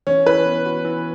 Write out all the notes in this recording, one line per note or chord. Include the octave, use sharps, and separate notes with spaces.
E3 C#4
E3 B4
B3
F#4
E3